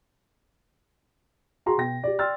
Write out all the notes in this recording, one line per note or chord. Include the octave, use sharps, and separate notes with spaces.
F#4 G#4 A#5 C6
B2 G5 A#6
G4 D5
D5 G5 C6 E6 F6 A6